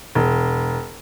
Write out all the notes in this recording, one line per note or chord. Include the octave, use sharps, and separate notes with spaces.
E1